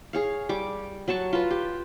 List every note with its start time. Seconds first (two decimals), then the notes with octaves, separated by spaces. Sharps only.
0.13 G#4 C#5 F5
0.49 G3 D6
1.08 F#3 F#4 A5 C#6
1.33 F4 B4
1.51 G4